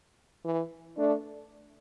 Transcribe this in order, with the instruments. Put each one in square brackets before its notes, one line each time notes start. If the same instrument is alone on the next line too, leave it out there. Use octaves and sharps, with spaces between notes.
[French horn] E3
[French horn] A3 [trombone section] D4